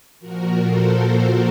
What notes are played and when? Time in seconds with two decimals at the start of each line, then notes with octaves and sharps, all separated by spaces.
0.20 A#2 F3 F#4 A#4
0.64 A4 C5